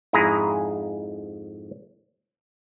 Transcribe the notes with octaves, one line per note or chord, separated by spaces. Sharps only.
F2 G#2 E4 G#4 A#5